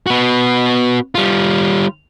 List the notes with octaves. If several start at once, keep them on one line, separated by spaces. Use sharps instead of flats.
B3 F#4
G3 F4